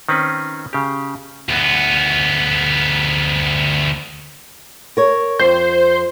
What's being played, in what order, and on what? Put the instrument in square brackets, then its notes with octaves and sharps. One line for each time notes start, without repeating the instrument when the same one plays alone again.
[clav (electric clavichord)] D#3 C4 C#4 B4
C#3 G4
[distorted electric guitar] D2 B3
[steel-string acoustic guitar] A#4 C#5
[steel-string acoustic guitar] F2 [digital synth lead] C5